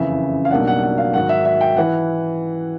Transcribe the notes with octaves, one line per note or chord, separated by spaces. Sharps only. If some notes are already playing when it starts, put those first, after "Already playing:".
Already playing: F#1 F2 C#3 E3 E5
F5
B1 B2 G3 A#3 D4 F#5
F#5
F#5
F5
G#2 D#3 F#3 F#5
E5
E5
G5
E3 F#5